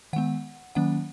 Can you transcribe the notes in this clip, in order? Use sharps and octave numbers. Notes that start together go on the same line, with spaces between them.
D#3 G#3 B3 F#5
D#3 F#3 A#3 C#4 F#5